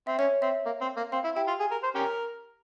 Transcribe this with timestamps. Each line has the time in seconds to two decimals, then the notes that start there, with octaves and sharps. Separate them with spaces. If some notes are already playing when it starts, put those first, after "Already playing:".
0.07 C4 E5
0.19 C#4 C#5
0.42 C4 E5
0.66 A#3
0.81 C4
0.97 A#3
1.12 C4 F5
1.24 E4
1.36 E4 G4 G5
1.48 F4
1.60 G#4
1.71 A#4
1.83 C5
1.95 C#4 G4 A#4